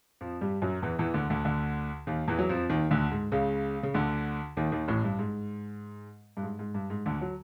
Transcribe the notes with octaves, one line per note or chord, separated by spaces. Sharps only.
F2 F3
G2 G3
F#2 F#3
E2 E3
E2 E3
D2 D3
D2 D3
D2 D3
D#2 D#3
E2 E3
F#3
F2 F3
D#2 D#3
D2 D3
G#2
C#2 C#3
C#3
D2 D3
D#2 D#3
D#2 D#3
A1 A2
G2
G#2
G2
G#2
G#2
G2
G#2
D2 D3
F#3